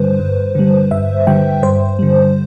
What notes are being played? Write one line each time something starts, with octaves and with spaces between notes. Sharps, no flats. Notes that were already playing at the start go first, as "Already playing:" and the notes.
Already playing: G2 D3 G3 B4 C5
G2
D3 G3
G2 E5
D3 G3 G5
G2 C5
D3 G3